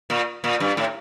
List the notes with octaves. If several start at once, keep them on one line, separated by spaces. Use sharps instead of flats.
A#2
A#2
G2
A2